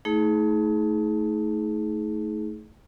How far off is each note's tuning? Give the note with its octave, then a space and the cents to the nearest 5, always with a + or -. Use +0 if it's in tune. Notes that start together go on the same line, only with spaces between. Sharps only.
A3 +0 D#4 +35 G#4 +25